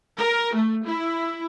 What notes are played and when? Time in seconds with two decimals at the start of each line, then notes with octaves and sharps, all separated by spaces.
0.17 A#4
0.54 A3
0.85 E4